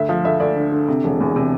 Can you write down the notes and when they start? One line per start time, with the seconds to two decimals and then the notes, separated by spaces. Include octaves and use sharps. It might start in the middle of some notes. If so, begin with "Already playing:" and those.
Already playing: D2 E5
0.09 F3
0.24 D2 E5
0.40 D2 D5
0.56 D3
0.72 D3
0.88 C3
1.04 E1
1.20 E2
1.36 C3